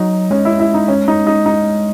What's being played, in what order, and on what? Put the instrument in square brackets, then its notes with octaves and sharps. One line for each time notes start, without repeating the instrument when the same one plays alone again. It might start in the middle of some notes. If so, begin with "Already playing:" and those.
Already playing: [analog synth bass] F#3 [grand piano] D#4
[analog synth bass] G#3 [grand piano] C#4
[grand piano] E4
E4
D#4
C#4
D#4
D#4
D#4